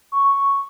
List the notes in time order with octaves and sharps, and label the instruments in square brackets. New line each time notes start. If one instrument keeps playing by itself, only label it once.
[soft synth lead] C#6